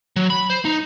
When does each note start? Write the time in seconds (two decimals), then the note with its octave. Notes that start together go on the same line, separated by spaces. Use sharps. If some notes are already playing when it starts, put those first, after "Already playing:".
0.16 F#3
0.30 B5
0.50 C5
0.65 D#4